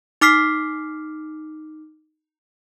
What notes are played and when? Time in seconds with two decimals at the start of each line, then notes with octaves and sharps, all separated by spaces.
0.21 D#4 D6 F6 B6 C7